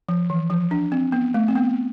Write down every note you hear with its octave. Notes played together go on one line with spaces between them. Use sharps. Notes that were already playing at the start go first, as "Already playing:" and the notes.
F3
E3
F3
D4
C4
B3
A3
C4
B3